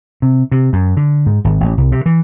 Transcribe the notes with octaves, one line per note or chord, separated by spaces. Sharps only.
C3
C3
F#2
D3
G#2
G#1
A1
C2
C3
E3